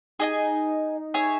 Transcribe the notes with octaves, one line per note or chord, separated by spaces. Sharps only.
D#4 G#4 D#5 G#5
D#4 G#4 C#5 E5